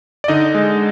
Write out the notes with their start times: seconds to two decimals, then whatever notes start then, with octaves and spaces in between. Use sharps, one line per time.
0.24 D5
0.28 D3 D#4 D#5
0.55 G#3